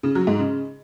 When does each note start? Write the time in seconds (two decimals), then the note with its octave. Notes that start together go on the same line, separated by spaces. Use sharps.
0.03 C#3
0.15 F#3
0.27 G#2
0.39 C#3